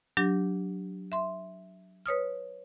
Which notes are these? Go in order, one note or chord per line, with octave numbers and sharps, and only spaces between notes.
F#3 D4 G4 A#6
E5 C6
B4 C#5 D#6 F6